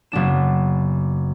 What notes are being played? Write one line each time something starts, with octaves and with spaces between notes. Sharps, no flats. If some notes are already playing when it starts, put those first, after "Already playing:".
F#1 B3 D4 E7